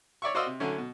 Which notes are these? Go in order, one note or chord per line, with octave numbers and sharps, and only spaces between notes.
C#5 D5 E5 C#6
F#4 C5 D5 D#5 F5 E6
C3
D3 F#3 A3 C#4
B2